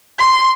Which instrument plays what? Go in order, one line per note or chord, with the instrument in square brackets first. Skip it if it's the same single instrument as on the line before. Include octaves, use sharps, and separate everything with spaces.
[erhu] C6